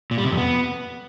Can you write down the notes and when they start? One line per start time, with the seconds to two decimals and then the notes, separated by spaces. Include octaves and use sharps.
0.11 A#2
0.18 G3
0.24 C3
0.31 F2
0.37 B3